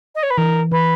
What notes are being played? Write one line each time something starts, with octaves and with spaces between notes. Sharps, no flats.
D#5
C#5
B4
E3 A#4
E3 B4